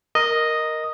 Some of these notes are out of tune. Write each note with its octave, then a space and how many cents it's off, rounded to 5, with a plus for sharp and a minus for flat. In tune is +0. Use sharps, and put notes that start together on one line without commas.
A#4 +0 D#5 +0